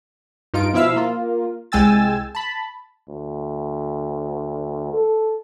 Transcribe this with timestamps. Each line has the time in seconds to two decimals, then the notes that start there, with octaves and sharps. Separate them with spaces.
0.54 G2 D#4 F4 D7
0.73 B2 F3 E4 E5 F5 E6
0.96 A#3 F4
1.72 C2 G#3 G5 G#5 E6 A6
2.35 A5 B5
3.09 D2
4.94 A4